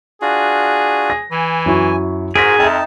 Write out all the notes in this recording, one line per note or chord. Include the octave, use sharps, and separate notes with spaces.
D4 F4 F#4 G#4
A#6
E3 G#5
F#2 E4 C#6
G#2 F#4 G#4 A#4 C5 A#6 B6 D7
F2 D#4 E5 G5 A5